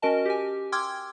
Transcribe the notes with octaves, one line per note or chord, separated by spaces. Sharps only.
C#4 F#4 A#4 D#5 A5
G4 G#5
G5 C6 D6 E6 F6 G#6